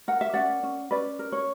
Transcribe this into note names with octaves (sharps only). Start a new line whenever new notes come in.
A#4 F#5
E5
C#4 D5 F#5
C#4
C#4 B4 D5
A#4
C#5